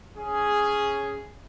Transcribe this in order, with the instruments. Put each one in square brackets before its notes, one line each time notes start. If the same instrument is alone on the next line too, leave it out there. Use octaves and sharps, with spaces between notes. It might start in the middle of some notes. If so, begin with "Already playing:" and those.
[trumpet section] C#4 G#4